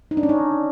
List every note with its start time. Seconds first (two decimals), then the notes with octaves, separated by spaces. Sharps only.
0.11 D#4
0.17 D4
0.23 C#4
0.29 D#4